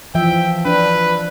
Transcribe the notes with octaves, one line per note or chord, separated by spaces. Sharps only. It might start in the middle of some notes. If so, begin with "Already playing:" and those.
E3 F3 E5 G5
D4 B4